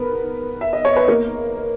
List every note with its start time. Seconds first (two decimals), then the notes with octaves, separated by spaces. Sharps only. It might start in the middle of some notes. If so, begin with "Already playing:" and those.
Already playing: B3 A#4 B4
0.61 E5
0.73 D#5
0.85 C#5
0.96 B4
1.08 A#3 A#4